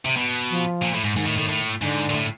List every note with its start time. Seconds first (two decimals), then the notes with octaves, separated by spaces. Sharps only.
0.05 C3
0.17 B2
0.50 F3
0.82 A#2
0.94 A2
1.04 G#2
1.15 G#2 D#3
1.26 A2
1.38 A2
1.49 A2
1.81 G#2 D3
2.10 A#2
2.14 A2